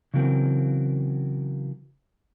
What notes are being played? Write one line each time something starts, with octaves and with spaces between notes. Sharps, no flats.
C#3 E3 F#3 C4 A#4